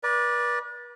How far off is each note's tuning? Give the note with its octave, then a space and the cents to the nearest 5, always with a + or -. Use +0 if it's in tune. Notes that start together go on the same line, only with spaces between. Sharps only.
B4 -40 D5 +0